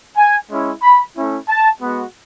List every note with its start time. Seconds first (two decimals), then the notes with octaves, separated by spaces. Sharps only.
0.16 G#5
0.50 G#3 C#4 E4
0.82 B5
1.16 A3 C#4 E4
1.49 A5
1.81 G#3 B3 F#4